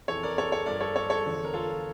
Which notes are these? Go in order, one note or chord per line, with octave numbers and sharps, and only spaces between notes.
F2 E3 A4 C#5
A#4 D5
A4 C#5
A4 C#5
G2 F3 A#4 D5
A4 C#5
A4 C#5
A4 C#5
E2 D3 F3
A#4
F4 A4